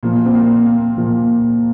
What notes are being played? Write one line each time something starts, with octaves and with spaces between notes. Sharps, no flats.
A#2 F3 A#3
C4
A#3
A#3
A#2 F3